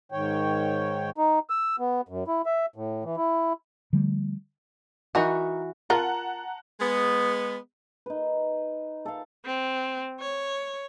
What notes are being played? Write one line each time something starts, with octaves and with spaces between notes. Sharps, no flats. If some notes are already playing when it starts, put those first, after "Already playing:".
G#2 D#3 C#5 G5
D#4
E6
B3
F#2
E4
E5
A2
E3
E4
D3 F3 G3 A3
E3 D#4 F#4 A#4 F#5
F4 A#4 F#5 A5 A#5
G#3 B3
D#4 B4
A4 F5
C4
C#5